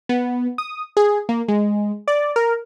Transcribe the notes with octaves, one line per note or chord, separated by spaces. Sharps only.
B3
D#6
G#4
A#3
G#3
D5
A#4